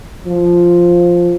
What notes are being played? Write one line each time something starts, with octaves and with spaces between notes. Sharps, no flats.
F3